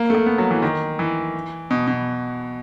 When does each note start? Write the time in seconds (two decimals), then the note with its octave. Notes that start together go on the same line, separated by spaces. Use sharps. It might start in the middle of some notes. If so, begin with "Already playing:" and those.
Already playing: A#3
0.10 A3
0.15 A#3
0.26 B3
0.38 F#3
0.51 E3
0.62 D#3
0.99 E3
1.71 B2
1.87 B2